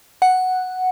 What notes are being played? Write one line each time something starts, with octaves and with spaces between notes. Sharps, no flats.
F#5